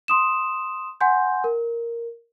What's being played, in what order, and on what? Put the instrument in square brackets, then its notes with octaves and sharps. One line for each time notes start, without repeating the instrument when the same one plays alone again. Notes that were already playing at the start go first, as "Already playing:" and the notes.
[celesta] C6 D#6 E7
F#5 G#5 C6 G6
A#4